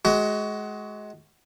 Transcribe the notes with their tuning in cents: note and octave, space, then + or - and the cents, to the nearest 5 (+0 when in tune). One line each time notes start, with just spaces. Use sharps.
G#3 +25 F#4 +25